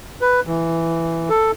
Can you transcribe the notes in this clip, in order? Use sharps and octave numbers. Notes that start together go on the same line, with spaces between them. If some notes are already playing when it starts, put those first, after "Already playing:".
B4
E3
A4